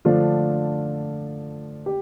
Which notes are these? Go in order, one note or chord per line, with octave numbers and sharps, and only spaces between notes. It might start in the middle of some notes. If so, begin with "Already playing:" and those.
D3 F3 A3 D4 F4
G4